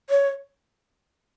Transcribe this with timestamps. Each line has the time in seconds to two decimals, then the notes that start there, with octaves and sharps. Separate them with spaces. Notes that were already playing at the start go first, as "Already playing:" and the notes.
0.10 C#5